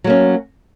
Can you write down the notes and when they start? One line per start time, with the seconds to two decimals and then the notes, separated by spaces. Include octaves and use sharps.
0.04 F#3
0.07 A#3
0.10 C#4